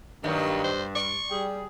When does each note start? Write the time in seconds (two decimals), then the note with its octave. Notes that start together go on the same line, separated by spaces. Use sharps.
0.24 G2 D#3 F#3 A#3
0.64 C5
0.95 D5 C#6
1.31 G3 G#4